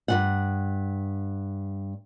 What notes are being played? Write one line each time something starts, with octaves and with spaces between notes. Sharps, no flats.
G2 D#3 F#5